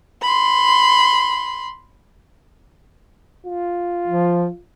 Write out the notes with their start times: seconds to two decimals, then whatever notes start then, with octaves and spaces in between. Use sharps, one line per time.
0.22 B5 C6
3.46 F4
4.07 F3